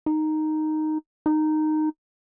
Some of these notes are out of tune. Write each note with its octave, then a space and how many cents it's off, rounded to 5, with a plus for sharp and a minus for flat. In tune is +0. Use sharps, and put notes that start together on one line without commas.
D#4 -5
D#4 -10